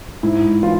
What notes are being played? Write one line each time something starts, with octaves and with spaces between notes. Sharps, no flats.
G#2 E4
E3 F4